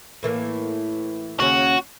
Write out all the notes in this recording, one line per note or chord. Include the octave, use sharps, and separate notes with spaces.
A2 E3 A#3
D#2 C#3 C#4 F#4